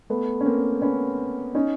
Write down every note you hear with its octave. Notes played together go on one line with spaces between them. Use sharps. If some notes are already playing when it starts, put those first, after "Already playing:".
A3 B3
C#4
A#3 C4
B3 C#4
C#4 D#4